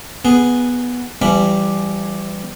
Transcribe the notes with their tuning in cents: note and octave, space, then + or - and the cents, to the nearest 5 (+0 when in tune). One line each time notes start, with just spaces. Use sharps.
B3 -5 G#4 +0
E3 +35 G3 +0 B5 +0